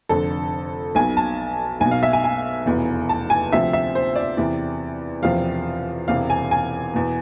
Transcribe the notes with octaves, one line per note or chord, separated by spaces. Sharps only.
F1 F2 D3 A4
B1 B2 G#5
A5
B1 B2 G#5
F5
E5
G#5
G#5
F1 E2 B2
A5
G#5
D2 C3 F3 E5
E5
C5
D5
E2 C3 E3
E1 E2 C3 F3 F5
E1 E2 C3 F5
G#5
G#5
E2 B2